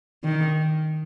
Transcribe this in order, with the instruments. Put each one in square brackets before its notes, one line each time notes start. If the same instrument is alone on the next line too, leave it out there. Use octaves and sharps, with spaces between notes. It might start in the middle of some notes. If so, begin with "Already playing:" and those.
[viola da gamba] D#3